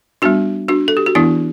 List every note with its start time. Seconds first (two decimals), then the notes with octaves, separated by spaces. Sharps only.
0.22 G3 B3 D4 F#4
0.69 D4 F#4
0.88 A4
0.97 G4
1.06 F#4
1.15 E3 B3 D4 E4